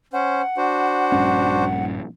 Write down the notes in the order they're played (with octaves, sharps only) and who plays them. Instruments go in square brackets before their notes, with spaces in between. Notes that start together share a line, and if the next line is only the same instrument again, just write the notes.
[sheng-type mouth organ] C#4 C5 [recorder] F#5
[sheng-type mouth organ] D4 F#4 C5
[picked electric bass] A#1 G2 C#4